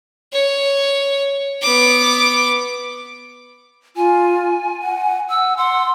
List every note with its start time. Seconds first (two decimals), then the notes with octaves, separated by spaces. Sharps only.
0.32 C#5
1.62 B3 D6
3.96 F4 G#5
4.83 F#5
5.30 F#5 E6
5.57 F#5 C6